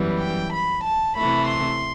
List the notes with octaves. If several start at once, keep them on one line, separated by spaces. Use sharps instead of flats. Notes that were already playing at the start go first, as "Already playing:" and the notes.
Already playing: F#2 E3 G3 B3
G5
B5
A5
C3 E3 A3 B5
C6